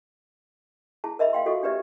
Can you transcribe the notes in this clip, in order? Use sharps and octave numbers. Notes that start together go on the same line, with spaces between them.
E4 G#4 A5
A#4 D#5 E5 B5
F5 G5 C6
F4 F#4 A4 D#5 C#6
D4 G4 B4 D5 E5